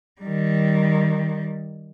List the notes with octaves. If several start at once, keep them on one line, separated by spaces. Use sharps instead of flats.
D#3 G3